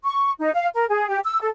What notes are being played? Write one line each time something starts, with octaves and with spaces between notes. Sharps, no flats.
C#6
D#4
F5
A#4
G#4
G4
E6
A4